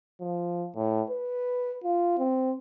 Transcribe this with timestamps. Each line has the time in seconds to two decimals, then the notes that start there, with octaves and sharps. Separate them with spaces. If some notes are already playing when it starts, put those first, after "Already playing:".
0.21 F3
0.76 A2
1.10 B4
1.84 F4
2.18 C4